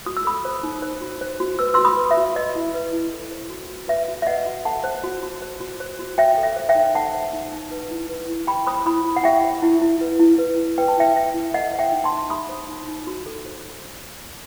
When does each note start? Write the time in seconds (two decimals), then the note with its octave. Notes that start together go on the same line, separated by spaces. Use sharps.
0.06 F#4 D#6
0.17 E6
0.25 A4 B5 D#6
0.45 C5
0.63 D#4
0.82 C5
1.01 F#4
1.21 C5
1.40 F#4
1.59 B4 E6
1.74 F#4 C6 E6
1.85 B5 D#6
1.97 B4
2.11 E5
2.17 F#4
2.35 B4 D#5
2.55 E4
2.74 B4
2.92 E4
3.13 A4
3.31 C5
3.50 F#4
3.70 F#4
3.88 B4 E5
4.08 F#4
4.22 E5
4.27 B4 D#5 F#5
4.46 F#4
4.65 A4 F#5 A5
4.84 C5
5.03 F#4
5.23 F#4
5.42 C5
5.60 F#4
5.80 C5
5.99 F#4
6.18 F#4 E5 G5
6.38 A4
6.43 E5
6.56 C5
6.69 E5 G5
6.75 D#4
6.94 A4 F#5 A5
7.14 C5
7.33 D#4
7.52 D#4
7.71 B4
7.91 E4
8.09 B4
8.28 E4
8.47 G4 G5 B5
8.67 C5 B5 D#6
8.86 E4 B5 D#6
9.05 E4
9.16 F#5
9.24 G4 E5 G5
9.44 C5
9.62 E4
9.82 E4
10.01 B4
10.20 E4
10.38 B4
10.58 E4
10.78 B4 G5
10.88 A5
10.97 E4 E5 G5
11.16 B4 E5
11.34 E4
11.54 A4 D#5 F#5
11.73 C5
11.79 E5 G5
11.92 D#4
12.04 A5 C6
12.11 D#4
12.30 G4 B5 D#6
12.49 C5
12.68 D#4
12.88 D#4
13.07 F#4
13.26 A4
13.46 C5